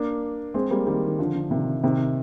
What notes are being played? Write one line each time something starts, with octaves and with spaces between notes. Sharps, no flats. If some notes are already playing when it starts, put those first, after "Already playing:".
Already playing: A#3 D4
G#3 C4
G3 A#3
D#3 G3
D#3
D3 F3
D3
C3 D#3
C3 D#3